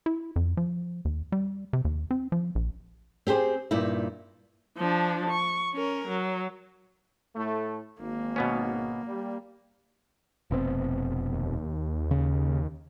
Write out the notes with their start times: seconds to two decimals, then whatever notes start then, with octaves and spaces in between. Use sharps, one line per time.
0.06 E4
0.36 F2
0.57 F3
1.05 D#2
1.32 G3
1.73 C3
1.85 D#2
2.11 C4
2.32 F3
2.55 A#1
3.27 C4 G4 G#4 C5
3.71 G2 A#2 D#4 E4
4.77 F3 D4
5.30 C#6
5.74 C#4 A#4
6.08 F#3
7.36 A2 A3
8.00 G#1 A#3
8.36 B2 B3 C#4
9.08 G3
10.51 F1 B2 C4
11.33 D#2
12.11 C#3